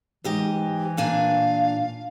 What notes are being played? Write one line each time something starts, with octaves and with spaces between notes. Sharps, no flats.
G#2 E3 G4 D#5
A#2 D4 F5 G#5